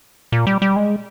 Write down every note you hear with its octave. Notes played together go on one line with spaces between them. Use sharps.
A#2
G3
G3
G#3